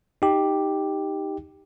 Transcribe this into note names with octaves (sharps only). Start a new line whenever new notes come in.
D#4 G4